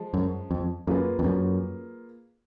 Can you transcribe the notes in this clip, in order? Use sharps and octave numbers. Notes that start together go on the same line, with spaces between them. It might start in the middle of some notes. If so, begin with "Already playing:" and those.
Already playing: F3 G#3
F#2
F2
F#2 A#3 F4 G#4 B4
F2
F#2